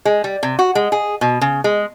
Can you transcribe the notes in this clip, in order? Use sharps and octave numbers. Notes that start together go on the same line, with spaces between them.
G#3
G3
C3
F#4
G#3
G#4
B2
C#3
G#3